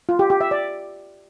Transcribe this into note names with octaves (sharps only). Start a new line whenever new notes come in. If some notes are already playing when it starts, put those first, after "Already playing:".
F4
G4
G4
E5
D5